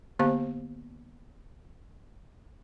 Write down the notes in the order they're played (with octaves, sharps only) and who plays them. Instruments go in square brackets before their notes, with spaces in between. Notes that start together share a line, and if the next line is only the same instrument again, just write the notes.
[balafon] D3 A#3 B3 G4 C5 F5